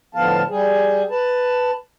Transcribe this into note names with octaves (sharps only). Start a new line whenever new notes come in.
A2 D3 F3 B3 F5 A5
G3 G#4
B4 A5